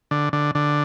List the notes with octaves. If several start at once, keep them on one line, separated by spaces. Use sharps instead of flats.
D3
D3
D3